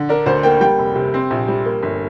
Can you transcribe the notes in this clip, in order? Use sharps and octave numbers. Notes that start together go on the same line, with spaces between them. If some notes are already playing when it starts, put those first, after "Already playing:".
Already playing: D3
D4 A#4
D2 C5
A#3 G5
G3 G5
F1
C3
C4
A#1
G3
A#3
G1